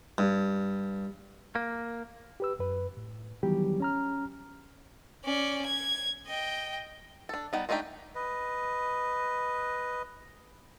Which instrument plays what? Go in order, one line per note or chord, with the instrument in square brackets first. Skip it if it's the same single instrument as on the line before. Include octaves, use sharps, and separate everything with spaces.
[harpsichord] G2
[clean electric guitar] A#3
[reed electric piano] G4 B4 E6
F#2 B4
A2
D#3 E3 F#3 G3 B3 G4
C#4 A#5 F6
[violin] C#4 D5
G#6
D#5 G5
[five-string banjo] D4 A4
G3 B3 D#4
G#3 A3 D4 D#4 G4
[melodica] B4 D#5